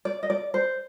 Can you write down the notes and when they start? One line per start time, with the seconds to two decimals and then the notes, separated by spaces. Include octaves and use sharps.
0.05 D5
0.23 D#5
0.30 D5
0.54 C5